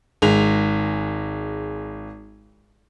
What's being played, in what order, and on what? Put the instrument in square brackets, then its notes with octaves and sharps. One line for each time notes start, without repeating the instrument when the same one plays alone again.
[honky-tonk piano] G#1 G#3 F7